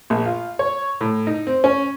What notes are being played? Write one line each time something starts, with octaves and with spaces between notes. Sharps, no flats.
A#1
F4
C#5
A2
D#4
C4
C#4